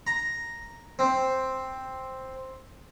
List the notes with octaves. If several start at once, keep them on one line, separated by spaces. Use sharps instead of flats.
A#5
C4